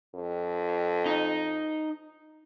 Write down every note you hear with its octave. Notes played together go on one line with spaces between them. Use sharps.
F2
D#4